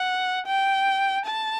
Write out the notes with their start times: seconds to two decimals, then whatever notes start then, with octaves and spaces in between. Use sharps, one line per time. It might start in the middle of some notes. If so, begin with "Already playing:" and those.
Already playing: F#5
0.46 G5
1.26 A5